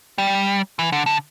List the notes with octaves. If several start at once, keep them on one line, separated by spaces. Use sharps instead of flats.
G3
E3
D3
D3